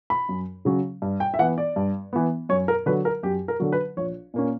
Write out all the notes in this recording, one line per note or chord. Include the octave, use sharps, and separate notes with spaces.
B5
F#2
C#3 F#3 C#4
G2
G5
E5
E3 B3 F#5
D5
G2
E3 B3
F#2 C#5
A#4
D3 F#3 B4
A#4
F#2 G4
A#4
D3 F#3
B4
A#1 C#5
A#2 A#3 C#4